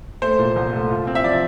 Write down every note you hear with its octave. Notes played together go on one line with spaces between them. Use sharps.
A3 C5
A#2
C2
A3
F4
C4
E5
F3 D5